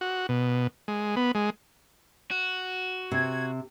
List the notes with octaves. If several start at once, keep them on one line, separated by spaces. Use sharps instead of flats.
F#4
B2
G#3
B3
G#3
F#4
C3 G#6